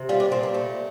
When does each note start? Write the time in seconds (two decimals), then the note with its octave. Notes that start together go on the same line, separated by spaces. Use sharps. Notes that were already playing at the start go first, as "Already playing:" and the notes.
Already playing: C3
0.09 G3 F4
0.20 D4
0.32 A#2 C4
0.43 A#3
0.54 A3